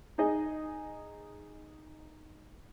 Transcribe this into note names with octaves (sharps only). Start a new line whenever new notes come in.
D#4 G#4 D#5